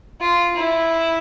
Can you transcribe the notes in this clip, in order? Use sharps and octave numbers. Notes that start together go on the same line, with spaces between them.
F4
E4